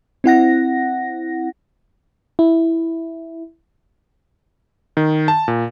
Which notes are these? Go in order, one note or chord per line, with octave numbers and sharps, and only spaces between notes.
C4 E4 F#5 A#6
E4
D#3
A5
A#2